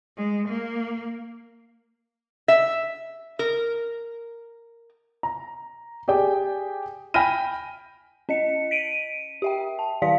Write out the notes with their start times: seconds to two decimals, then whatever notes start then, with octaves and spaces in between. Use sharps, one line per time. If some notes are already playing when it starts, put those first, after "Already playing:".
0.17 G#3
0.49 A#3
2.48 E5
3.39 A#4
5.23 A#5
6.08 G4 G#4 D5 G5
7.14 G5 G#5 B5 F6 A#6 D#7
8.29 C#4 D#5 C#7
8.71 B6 D7 D#7
9.42 G4 E5 G5
9.79 A5
10.02 D#3 E4 G4 D5 F5 B6